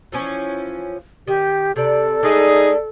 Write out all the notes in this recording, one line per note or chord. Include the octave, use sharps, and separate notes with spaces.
E3 F3 C#4
D#3 G4
C3 A4 D5
G#3 A3 D4 D#4 G#4